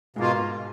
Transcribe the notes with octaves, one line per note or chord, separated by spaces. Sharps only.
G#2 B2 G#3 A#3 F4